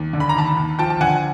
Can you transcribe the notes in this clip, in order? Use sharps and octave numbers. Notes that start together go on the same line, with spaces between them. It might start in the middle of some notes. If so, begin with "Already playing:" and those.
Already playing: D#2
D3
B5
A#5
D#2 A5 B5
D#2
F3 G5 A5
A5
D3 F#5 G#5